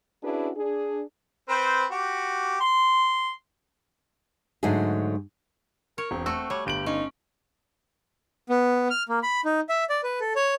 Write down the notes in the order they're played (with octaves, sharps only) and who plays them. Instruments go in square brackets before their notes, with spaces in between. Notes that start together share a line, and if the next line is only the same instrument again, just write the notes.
[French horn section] C#4 D4 E4 F#4 G#4 B4
D4 G#4
[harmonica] C4 B4 C5
F#4 G4
C6
[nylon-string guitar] G#2 D3 F#3 A3 D#4 G#4
[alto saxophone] A#4 [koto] C#5
[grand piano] E1 [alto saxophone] C4
[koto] A3 F#4 [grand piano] E6
[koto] G3 [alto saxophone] C#5
[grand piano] G1 D7 F#7 [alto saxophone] G4
[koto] C#4 [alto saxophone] D#4
[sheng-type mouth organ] B3
F6
A#3
B5
D#4
E5
D5
B4
A4
C#5